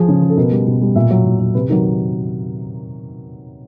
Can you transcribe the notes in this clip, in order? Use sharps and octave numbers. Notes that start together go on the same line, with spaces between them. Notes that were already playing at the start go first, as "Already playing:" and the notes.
Already playing: F3 G#4
C#3
F3
A4
B2 A#4
G3
B2
G3
A#2 E5
F#3
A#2
F#3
C3 B4
D#3 F#3 A#4